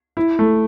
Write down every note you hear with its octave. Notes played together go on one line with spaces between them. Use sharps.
E4
A3